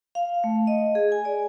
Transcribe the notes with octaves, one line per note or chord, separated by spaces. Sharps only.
F5
A3
D#5
G#4
G#5
D5